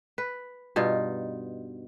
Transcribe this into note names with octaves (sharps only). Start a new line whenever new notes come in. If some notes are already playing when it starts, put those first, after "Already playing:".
B4
G2 B2 D#4 F4